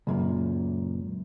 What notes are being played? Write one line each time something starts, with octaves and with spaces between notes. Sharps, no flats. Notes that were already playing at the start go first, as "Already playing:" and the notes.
C#2 F#2 A#2